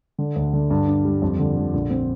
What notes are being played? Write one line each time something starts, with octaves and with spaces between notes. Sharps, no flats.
D3
D2
D3
G2
D4
G3
F2
D3
D3
A#1
C4